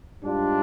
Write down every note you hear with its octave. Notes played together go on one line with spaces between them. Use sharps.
G#2 G3 D4 F4